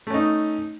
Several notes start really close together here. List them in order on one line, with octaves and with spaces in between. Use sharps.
A3 C#4 D#4